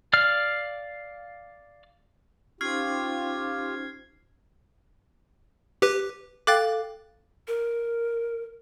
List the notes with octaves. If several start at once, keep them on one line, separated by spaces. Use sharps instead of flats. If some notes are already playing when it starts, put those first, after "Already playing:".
D5 F5 F6
C#4 D#4 F4 G4 C5 F6 G#6 C7
G4 B4
A4 F5 G5 D6 F#6 A6
A#4